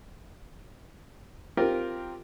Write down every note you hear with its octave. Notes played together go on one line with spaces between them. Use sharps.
C4 F4 G4 A#4